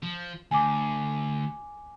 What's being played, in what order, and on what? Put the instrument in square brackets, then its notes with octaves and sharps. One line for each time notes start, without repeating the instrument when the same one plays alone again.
[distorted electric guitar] F3
[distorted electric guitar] D2 [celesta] G#5 D6